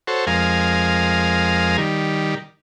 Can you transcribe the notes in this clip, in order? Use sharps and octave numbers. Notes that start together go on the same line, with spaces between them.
F#4 A4 C5 C#5
F2 G#3 A#4 F5 G#5
D#3 G3